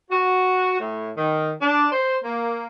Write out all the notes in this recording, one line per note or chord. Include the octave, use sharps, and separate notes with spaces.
F#4
A2
D#3
D4
C5
A#3